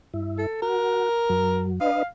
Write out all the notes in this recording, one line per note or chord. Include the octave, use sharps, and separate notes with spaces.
G2 E4
A4
F#4 A#4
F#2 F#3
D4 B4 D#5 F5